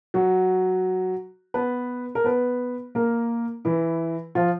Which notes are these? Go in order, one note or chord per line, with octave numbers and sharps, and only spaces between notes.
F#3 F#4
B3 B4
A#4
B3 B4
A#3 A#4
E3 E4
F3 F4